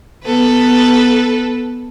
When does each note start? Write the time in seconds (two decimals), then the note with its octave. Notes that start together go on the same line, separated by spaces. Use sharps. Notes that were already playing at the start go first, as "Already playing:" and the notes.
0.25 B3 A4 B4